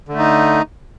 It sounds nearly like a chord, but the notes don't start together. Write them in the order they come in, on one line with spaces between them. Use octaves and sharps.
D3 A3 D#4